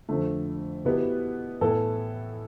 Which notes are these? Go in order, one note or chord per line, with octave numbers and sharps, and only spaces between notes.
F2 D3 A3
B2 B3 E4 G4 B4
A2 E3 B3 E4 A4